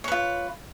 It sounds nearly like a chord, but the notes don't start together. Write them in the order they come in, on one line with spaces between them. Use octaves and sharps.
C#5 B4 F4